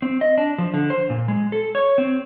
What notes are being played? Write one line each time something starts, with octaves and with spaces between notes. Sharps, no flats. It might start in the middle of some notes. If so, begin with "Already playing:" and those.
C4
D#5
D4
F3
D3
C5
A#2
G#3
A4
C#5
C4